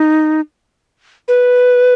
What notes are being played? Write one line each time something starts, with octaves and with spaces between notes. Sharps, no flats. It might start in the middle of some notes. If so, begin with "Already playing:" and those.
Already playing: D#4
B4